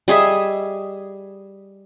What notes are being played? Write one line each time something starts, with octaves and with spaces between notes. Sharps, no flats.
G3 G#4 D#5 E5